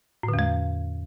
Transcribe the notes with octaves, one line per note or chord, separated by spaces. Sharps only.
A2
D3
E2
G#3